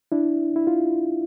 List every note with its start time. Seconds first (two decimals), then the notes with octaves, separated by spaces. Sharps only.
0.12 D4 E4
0.56 E4
0.67 F4